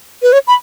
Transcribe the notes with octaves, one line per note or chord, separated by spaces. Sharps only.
B4
C#5
B5